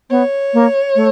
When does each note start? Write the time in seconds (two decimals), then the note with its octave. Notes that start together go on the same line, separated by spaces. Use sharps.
0.10 B3 C#5
0.54 A#3
0.95 A3